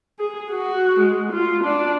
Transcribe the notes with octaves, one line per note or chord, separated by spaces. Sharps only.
G#4
F#4
G#3
F4
D4